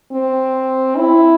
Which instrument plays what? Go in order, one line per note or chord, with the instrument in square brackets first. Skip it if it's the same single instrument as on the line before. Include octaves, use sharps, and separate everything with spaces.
[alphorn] C4
E4